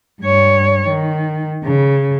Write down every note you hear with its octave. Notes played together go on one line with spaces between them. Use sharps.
G2 C#5
D#3
C#3